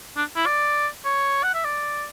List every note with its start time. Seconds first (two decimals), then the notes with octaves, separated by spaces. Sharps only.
0.17 D4
0.36 E4
0.46 D5
1.05 C#5
1.43 F#5
1.54 E5
1.65 D5